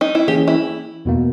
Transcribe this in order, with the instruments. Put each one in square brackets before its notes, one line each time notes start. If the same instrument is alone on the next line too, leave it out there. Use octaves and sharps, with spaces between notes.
[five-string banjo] D#4
E4
[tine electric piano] E3 A#3 C#4 G#4 [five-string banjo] G4
[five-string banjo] E4
[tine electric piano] E2 B2 A#3